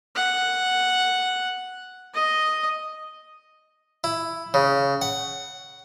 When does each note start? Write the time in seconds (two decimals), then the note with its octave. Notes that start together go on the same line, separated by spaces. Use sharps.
0.15 F#5
2.14 D#5
4.04 E4
4.54 C#3
5.02 F#5